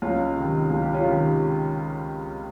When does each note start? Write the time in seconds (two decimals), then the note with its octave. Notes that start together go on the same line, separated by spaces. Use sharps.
0.02 C#2 C#4 F4
0.36 C3 D#3
0.70 C#2 F4
0.82 G4
0.94 C#4 F4
1.04 C3 D#3